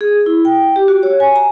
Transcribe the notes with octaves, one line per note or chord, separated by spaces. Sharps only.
G#4
E4
G5
G4
F#4
C#5
G#5
A#5